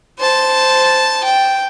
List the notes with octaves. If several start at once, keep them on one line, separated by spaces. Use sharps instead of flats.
C5 A5
G5